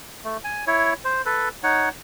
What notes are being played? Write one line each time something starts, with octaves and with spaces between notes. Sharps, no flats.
A3
G#5
E4 C#5
C5
A4 B4
D#4 C#5 F#5